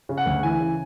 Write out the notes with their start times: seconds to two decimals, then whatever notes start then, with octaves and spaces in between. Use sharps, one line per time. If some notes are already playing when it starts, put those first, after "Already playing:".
0.09 C#3
0.18 F#5
0.26 D2
0.43 E3 G#5
0.60 C#3